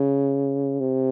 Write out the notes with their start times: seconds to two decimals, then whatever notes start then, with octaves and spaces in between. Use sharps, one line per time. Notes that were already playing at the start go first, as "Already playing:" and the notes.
Already playing: C#3
0.80 C3